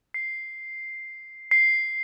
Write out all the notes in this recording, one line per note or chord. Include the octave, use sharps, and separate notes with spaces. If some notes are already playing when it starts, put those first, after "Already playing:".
C7
C7